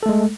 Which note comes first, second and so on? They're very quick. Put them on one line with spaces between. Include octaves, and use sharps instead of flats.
A4 A3 G#3